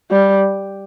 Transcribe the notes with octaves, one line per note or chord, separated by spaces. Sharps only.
G3